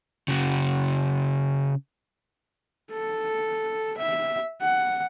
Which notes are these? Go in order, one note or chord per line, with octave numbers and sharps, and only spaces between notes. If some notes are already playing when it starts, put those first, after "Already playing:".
C#3 F#4
A4
E5
F#5